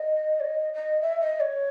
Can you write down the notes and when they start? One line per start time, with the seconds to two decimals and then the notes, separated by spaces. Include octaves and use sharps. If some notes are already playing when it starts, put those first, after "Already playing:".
Already playing: D#5
0.40 C#5
0.45 D#5
0.74 D#5
1.01 E5
1.20 D#5
1.40 C#5